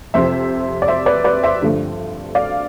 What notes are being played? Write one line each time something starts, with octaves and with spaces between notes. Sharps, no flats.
F2 C3 F3 C5 E5
D5
C5 E5
B4 D5
B4 D5
C5 E5
G2 D3 F3 A3
D5 F5